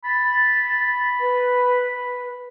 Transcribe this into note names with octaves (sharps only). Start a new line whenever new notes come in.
B5 A6
B4